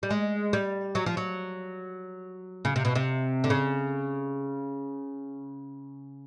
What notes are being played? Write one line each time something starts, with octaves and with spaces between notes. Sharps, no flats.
G3
G#3
G3
F#3
F3
F#3
C#3
C3
B2
C3
D3
C#3